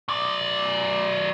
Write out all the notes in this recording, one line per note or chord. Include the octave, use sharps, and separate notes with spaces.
F#3 D5